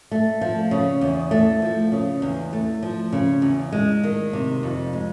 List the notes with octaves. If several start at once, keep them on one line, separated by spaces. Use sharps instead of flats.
A3
F3
C#3
E2
A3
F3
C#3
E2
A3
F3
C#3
E2
G#3
D#3
C3
F2
G#3